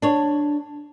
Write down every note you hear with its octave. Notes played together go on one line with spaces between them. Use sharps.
D4 C#5